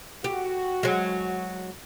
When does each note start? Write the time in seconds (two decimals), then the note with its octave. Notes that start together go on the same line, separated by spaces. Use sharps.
0.24 F#4 G4
0.83 F#3 G#3